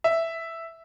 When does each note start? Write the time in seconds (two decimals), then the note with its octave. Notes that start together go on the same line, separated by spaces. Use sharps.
0.04 E5